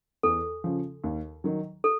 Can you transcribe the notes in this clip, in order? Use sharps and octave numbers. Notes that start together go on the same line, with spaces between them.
E2 A4
C#3 F3
D#2
D#3 F#3
A4